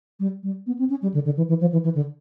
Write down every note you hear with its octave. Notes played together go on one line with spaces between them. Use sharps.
G3
G3
B3
C4
C#4
G3
D3
D3
E3
E3
F3
E3
E3
D3